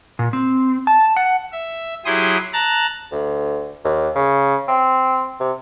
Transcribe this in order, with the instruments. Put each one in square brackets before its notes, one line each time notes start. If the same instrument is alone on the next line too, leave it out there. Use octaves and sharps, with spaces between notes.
[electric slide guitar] A#2
C4
A5
F#5
[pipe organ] E5
F#3 E4 G4 G#4 C6 D#6
A5 A#5 F#6 A6
[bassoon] D2
D#2
C#3
C4
C3